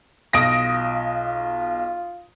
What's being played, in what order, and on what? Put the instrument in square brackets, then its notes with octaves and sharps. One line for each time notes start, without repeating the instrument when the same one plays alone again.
[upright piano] B1 D7 [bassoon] F4 [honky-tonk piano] D#6 A#6